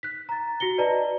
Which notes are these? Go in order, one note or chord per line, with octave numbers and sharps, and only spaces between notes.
F#6 B6
A#5 A6
F#4 A#6 C#7 G7
B4 D5 D#5 A5 A#5